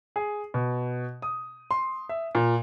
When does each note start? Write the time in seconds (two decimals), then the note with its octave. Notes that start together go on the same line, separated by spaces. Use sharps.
0.16 G#4
0.54 B2
1.22 D#6
1.71 C6
2.09 E5
2.35 A#2